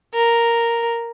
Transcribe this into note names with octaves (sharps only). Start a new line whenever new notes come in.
A#4